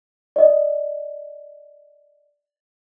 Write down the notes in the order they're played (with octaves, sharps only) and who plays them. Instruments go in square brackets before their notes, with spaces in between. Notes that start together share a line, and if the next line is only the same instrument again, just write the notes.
[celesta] D5 D#5